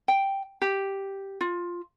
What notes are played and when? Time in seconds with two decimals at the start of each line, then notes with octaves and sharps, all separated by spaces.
0.08 G5
0.62 G4
1.41 F4